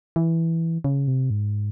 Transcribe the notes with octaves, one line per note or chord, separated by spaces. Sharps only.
E3
C#3
C3
G#2